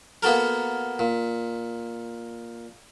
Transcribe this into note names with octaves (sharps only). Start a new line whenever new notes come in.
A#3 B3 F#4 A4 A#4
A#2